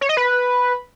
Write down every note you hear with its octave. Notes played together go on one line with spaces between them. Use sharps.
C#5
D#5
B4